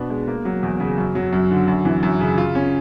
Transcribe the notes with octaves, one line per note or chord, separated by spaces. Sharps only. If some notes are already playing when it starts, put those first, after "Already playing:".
Already playing: B2 B3 D4
G#3
A#3
F#3
E2
C#3
F#2
F#3
F#2
D3
F#2
E3
F#2
C#3
F4
C#4